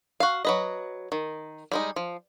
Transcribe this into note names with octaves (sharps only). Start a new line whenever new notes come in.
F#4 F5
F#3 B4 D#5
D#3
G3 G#3 D#4
F3